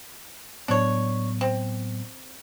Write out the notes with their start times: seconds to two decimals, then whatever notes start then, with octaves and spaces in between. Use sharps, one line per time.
0.68 A2 F#3 B3 D4 C#5
1.41 C4